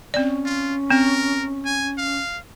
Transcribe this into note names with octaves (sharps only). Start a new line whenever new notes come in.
C4 C#4 D5
F4
C4 A#4
G#5
F5